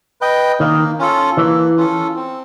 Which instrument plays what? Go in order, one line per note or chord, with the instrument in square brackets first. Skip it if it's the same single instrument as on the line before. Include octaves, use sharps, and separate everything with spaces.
[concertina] B4 D#5 G5
[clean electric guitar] D#3 [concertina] A#3
[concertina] C#4 F4 A4
[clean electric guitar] E3 [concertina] A#3
[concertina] C#4 F4 A4
C4